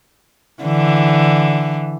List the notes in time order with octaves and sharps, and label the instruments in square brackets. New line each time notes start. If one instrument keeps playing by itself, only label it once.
[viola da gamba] D3 E3